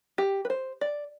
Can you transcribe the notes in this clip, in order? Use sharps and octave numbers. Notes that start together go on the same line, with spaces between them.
G4
B4
C5
D5